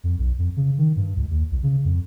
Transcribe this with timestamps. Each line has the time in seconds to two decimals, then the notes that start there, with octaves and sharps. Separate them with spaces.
0.04 F2
0.19 B1
0.38 F2
0.57 C#3
0.78 D#3
0.96 G2
1.17 C#2
1.30 D#2
1.51 C2
1.63 C#3
1.85 F2